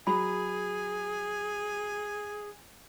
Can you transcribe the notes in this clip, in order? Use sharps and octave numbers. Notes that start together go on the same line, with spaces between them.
F#3 G#4 G#5 B5